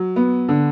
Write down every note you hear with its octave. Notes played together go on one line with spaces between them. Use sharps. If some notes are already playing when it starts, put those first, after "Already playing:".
Already playing: F#3
B3
D3